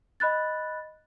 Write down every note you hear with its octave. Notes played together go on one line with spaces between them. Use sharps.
D#5 B5 F#6 A6